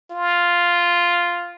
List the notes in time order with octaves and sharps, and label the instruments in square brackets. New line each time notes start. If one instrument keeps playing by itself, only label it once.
[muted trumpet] F4